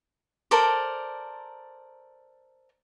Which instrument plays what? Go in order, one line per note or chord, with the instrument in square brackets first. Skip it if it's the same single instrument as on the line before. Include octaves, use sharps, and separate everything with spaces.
[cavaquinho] A4 A#4 C5 D5